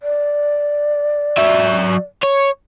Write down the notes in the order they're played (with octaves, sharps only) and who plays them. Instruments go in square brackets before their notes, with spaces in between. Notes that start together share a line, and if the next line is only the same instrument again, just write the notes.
[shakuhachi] D5
[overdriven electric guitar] F#3 E5
C#5